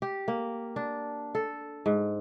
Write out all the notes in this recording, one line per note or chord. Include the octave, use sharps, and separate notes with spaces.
G4
A#3
D4
A4
G#2